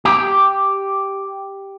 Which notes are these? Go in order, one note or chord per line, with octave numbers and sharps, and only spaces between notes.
G4